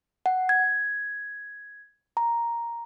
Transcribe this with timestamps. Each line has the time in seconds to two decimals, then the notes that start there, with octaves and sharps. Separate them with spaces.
0.26 F#5
0.49 G#6
2.17 A#5